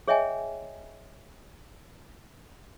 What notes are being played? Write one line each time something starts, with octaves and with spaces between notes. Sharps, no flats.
G#4 C#5 D#5 E5 G5 G#5